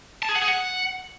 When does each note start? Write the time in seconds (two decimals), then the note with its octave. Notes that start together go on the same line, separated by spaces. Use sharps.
0.23 A5
0.29 G#4
0.35 F#5
0.42 G#4
0.48 F#5